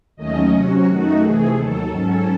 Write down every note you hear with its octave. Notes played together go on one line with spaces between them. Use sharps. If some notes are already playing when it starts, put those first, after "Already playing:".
D#2 D#3 F#3 A3 C#4 D#5
C3 F#3 C#4 F#4
F#2 D#3 A3 D#4
C3 E3 A3 G#4
D#2 D#3 F#3 A4
G#2 F#3 C#4